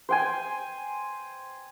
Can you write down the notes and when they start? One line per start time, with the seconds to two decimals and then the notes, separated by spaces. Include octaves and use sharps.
0.09 C5 G5 G#5